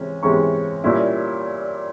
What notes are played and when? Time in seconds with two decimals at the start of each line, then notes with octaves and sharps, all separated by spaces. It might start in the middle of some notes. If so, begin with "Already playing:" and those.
Already playing: C3 E3 G#3 C#4
0.23 C3 E3 G#3 C#4 C#6
0.84 A#2 G3 C#4 E4